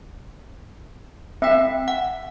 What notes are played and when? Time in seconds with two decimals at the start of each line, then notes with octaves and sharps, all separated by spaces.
1.42 C4 E5 G5
1.88 F#5